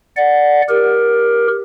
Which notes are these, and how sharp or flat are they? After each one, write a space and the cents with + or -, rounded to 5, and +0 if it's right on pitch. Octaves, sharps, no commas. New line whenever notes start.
D5 +0 F#5 -5
G4 +10 A#4 +15